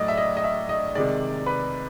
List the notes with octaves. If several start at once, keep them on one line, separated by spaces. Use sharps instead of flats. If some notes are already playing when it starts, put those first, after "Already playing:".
Already playing: A2 F#3 A3 D5 D#5
E5
D#5
D#5
E5
D#5
C3 D#3 G#3 D5
B4